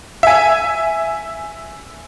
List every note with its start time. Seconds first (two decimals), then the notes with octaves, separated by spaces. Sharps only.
0.23 E5 G#5